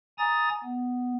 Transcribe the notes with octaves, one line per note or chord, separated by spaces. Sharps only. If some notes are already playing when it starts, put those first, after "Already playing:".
G#5 A#5 D#6 A6
B3